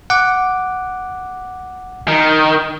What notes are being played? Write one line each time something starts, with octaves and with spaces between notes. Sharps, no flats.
F#5 D6
D#3